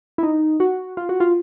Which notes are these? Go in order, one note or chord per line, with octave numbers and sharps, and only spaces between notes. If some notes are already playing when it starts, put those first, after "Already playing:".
E4
D#4
F#4
F4
F#4
F4